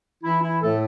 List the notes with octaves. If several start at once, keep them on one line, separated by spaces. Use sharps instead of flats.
E3 E4
E4
A2 A3 A4